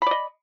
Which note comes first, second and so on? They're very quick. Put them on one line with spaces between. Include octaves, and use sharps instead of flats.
B5 D5 D#5